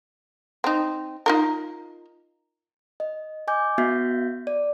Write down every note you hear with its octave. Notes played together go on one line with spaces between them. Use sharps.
C4 D#4
D#4 F4 A#4
D#5
D#5 G#5 D6 G6
B3 F#4 E5 G6 B6
D5